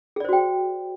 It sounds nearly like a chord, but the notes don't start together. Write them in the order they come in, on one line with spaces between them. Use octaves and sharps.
G#4 D5 C5 F#4 G5